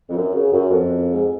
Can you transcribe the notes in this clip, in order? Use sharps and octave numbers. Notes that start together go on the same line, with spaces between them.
F2
F#2
C#3
F#2
F2
G#2